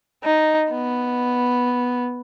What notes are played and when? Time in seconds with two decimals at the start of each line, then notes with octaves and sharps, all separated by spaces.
0.24 D#4
0.70 B3